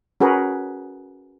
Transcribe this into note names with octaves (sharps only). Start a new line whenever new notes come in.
C#4 F#4 G#4 A#4 B4